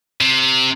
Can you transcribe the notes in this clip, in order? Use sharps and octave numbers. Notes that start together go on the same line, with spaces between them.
C3